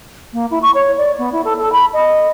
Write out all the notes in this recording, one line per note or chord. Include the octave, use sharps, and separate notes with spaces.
A#3
E4
C#6
C#5
D5
B3
E4
A4
A4
B5
D#5